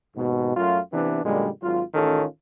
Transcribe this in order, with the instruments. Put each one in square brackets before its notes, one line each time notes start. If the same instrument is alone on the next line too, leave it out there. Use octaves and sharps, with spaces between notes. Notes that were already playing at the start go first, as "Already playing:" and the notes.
[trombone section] D#2 G#2 B2
F#2 F#3 A3 F4
C3 E3 B3 D4
F#2 A#2 D3 G3 G#3
G#1 F#3 F4
A1 D#3 C#4 F4 A4